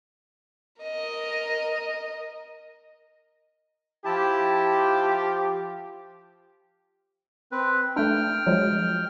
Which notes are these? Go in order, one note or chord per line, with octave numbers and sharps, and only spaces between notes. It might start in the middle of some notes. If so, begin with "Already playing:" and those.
A#4 D#5
F3 E4 G4 A5
C4 B4
A3 D4 G5 F6
F3 F#3 G#3